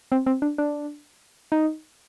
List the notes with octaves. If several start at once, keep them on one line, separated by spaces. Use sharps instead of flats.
C4
C4
D4
D4
D#4